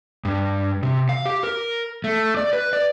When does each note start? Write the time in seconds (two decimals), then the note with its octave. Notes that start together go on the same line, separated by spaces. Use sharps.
0.25 G2
0.83 C3
1.09 F5
1.26 G4
1.43 A#4
2.04 A3
2.37 D5
2.53 B4
2.73 D5